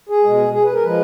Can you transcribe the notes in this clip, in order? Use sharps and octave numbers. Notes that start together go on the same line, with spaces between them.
G#4
B2 G#3
G#4
B4
A#4
F3 G#3 B4